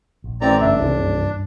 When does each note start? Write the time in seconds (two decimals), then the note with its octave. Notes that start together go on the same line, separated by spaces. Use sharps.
0.24 A#1
0.41 A1 C4 D5 A#5
0.61 F#1 G2 D4 E5
0.79 D#1 C2 C3 E3 F3
0.98 G2